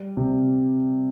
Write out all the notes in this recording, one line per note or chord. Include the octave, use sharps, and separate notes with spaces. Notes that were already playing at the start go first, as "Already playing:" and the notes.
Already playing: G3
C3